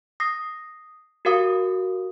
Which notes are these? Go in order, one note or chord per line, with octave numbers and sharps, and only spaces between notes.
D#6 A#6 C7
F#4 G4 A#4 F5 D#6